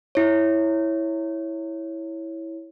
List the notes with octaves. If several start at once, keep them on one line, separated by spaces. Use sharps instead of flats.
E4 C#5